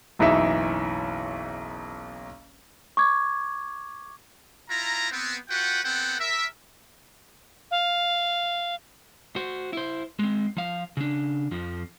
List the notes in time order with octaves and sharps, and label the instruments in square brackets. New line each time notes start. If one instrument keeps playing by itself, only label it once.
[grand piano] F#1 B1 E3 D#4 E5
[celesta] C#6 D6 G#6
[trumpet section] E4 F4 A#5
B3 C4
F4 F#4 B4 F#5 G5
B3 C4 A4 F#5 G5
A#4 E5
[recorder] F5
[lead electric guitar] F#4 C5
E4 C5
G#3 C4
F3 F5
C#3 D4
F2 F3